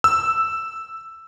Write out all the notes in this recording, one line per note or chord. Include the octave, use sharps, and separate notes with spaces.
E6